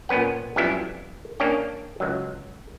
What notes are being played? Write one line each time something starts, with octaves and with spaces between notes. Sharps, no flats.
A#2 B3 C#4 B4 F#5
F2 F#3 G3 B3 C#4 E4
A#3 C#4 D4 C#5 G5
C#2 F#3